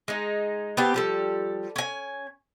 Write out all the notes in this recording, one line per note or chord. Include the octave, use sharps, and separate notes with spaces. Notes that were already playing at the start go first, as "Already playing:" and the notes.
G#3 D#4
B3 C4 G4 A5
F3 G3 A4
C#4 G#5